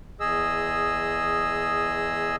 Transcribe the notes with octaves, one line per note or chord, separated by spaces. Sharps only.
E2 G#4 D#5 E6